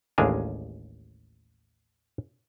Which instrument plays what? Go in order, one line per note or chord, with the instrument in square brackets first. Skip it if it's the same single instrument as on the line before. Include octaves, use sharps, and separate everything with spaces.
[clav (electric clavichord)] A1 D#2 G#3 D4 F5 G#5